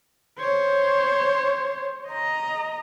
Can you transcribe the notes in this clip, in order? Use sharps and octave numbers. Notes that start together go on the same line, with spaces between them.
C5 C#5
D#5 A#5